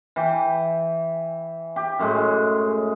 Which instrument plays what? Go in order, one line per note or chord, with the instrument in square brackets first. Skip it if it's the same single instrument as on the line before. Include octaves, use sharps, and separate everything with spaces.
[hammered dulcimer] E3 G5
G4
F#2 A2 G#3